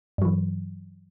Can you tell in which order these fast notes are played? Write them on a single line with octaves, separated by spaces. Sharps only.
G2 F#3 E3